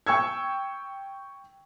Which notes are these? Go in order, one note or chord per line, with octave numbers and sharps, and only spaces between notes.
G5 C#6 E6 G#6